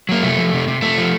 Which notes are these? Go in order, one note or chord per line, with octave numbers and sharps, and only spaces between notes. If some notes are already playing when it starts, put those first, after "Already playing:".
F#3 A#3
C3 A3
F3
C3
C3
C3 A3
F3